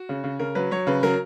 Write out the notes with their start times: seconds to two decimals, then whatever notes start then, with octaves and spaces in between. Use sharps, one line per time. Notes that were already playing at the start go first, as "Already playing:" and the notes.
Already playing: F#4
0.09 C#3
0.24 C#3
0.39 C#3 A#4
0.55 F#3 B4
0.71 F#3 C#5
0.87 C#3 B4
1.03 F#3 A#4